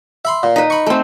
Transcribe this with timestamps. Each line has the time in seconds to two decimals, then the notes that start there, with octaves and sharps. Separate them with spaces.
0.25 E5 B5 C6
0.43 A#2
0.56 D#4 B4
0.70 B5 C#6
0.86 A3 C4